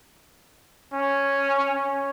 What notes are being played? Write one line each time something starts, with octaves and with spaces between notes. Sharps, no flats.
C#4
C#4